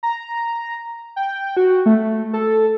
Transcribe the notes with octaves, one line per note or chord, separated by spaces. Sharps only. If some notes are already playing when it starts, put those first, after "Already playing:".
A#5
G5
F#4
A3
A4